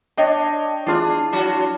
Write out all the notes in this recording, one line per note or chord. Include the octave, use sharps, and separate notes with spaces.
D4 C#5 D#5 G5
E3 D4 F4 G#4
F#3 D4 F#4